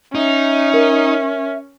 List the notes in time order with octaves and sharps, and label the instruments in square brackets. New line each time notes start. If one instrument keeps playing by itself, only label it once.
[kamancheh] C#4 [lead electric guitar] D#4 [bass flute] E5
[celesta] A#4